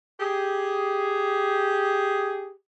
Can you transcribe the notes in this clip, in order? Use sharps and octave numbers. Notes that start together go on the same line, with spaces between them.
G4 G#4